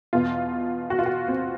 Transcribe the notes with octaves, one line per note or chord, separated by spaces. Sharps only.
E2 B2 F4
F#4
F4
F#4
C4